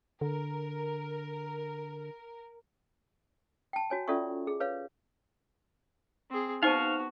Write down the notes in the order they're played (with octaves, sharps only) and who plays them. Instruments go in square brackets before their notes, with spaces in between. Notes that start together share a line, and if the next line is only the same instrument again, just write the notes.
[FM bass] D3 [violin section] A#4
[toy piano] G5 A5
F#4 C#5 G#5
C#4 F4 A4 D5 E5 C#6
G#4
B4 C#5 F5
[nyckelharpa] C4 G#4
[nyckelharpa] B3 F#4 [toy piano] D#4 C5 A5 [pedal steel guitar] F5 C#6